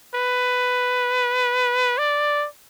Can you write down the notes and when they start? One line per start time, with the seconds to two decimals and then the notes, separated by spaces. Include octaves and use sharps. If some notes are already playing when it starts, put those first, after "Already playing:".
0.14 B4
1.98 D5